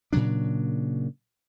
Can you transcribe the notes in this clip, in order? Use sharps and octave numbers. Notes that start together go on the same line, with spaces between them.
A#2 C#3 F#3 D4